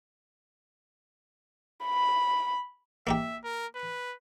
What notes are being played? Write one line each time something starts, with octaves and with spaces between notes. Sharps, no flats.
B5
A#3 D#4 G4 E5
A#4
B4